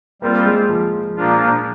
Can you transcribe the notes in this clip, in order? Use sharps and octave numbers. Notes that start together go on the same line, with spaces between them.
G3 A#3 C4 F4
G#3
F3
A#2 F3 A#3 D4 F4